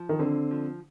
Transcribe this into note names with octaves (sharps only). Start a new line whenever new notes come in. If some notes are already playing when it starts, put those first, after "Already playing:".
Already playing: F3
D#3
D3 C4
F3